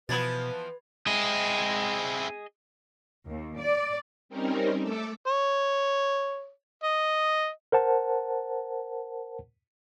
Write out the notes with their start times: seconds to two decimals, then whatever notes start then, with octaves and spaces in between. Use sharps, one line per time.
0.09 B2 E3 F3 B3 B4 B5 G#6 A6
1.07 C4 E4 G#4 D#5
3.27 D#2
3.57 D5
4.29 G3 C4 C#4 D#4 A#4
4.81 A3 A4 D6 E6
5.27 C#5
6.84 D#5
7.72 A#4 C5 F#5 A5